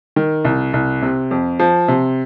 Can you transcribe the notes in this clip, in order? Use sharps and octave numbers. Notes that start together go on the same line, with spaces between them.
D#3
C2
C2
C3
F2
F3
C3